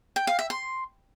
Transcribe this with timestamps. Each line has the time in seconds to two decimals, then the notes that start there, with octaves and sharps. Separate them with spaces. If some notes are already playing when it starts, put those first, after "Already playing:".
0.16 G5
0.27 F5
0.39 E5
0.50 C6